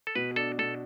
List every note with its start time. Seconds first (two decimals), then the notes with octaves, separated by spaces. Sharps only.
0.07 A4
0.15 B2 B4
0.36 D4 A4
0.58 B2 A4